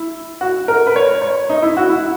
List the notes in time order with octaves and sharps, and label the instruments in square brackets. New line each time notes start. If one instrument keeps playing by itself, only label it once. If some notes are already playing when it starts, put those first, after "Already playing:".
Already playing: [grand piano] E4
F#4
A#4
B4
C#5
C#5
D#4
E4
F#4
E4